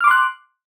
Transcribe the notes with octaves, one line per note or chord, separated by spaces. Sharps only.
C6 D6 F6 F#6